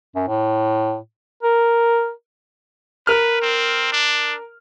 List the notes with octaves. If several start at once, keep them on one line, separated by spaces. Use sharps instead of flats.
F#2
A2
A#4
A#4 B4 F6
C4
D4